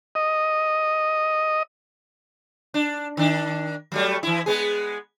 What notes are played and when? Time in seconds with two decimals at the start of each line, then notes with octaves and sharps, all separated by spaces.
0.15 D#5
2.74 D4
3.17 D#3 D4
3.92 F#3 G3 A3
4.23 E3 E4
4.46 G#3 B3 G#4